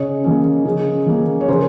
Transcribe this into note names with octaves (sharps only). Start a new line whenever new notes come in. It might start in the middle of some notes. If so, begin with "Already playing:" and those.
Already playing: C#3 C#5 D#5
F3 A#3 C#4
C#3
F3 A#3 C#4
C#5
C#3 A#4 C5